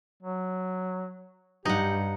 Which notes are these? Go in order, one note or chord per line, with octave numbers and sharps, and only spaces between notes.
F#3
G2 D#4 G4 F#5